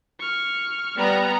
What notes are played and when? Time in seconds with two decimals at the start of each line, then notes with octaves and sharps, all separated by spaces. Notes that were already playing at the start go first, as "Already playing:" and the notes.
0.19 C#6 F6
0.98 G3 B3 A#5